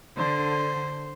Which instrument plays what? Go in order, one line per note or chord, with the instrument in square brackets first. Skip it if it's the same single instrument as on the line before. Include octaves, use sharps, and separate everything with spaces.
[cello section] D3 [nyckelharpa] C5